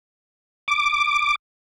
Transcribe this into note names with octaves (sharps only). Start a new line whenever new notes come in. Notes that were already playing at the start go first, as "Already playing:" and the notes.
D6